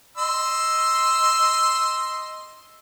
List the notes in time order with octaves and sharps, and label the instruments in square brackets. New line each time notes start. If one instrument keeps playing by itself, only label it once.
[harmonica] D#5 C6 E6